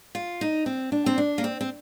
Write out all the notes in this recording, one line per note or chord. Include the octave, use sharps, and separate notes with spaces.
F4
D#4
C4
D4
C4
D4
A#3
C4
C4